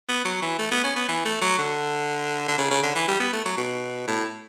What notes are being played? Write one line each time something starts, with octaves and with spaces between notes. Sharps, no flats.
B3
F#3
E3
A3
B3
C#4
B3
E3
A3
F#3
D3
D3
C#3
C#3
D3
E3
G3
B3
A3
F#3
B2
A2